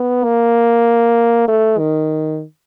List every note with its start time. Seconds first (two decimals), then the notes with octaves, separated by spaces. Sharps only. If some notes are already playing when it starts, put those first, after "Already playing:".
Already playing: B3
0.25 A#3
1.48 A3
1.79 D#3